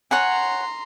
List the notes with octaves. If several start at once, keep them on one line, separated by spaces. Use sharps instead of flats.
C#5 F#5 G#5 A#5 C6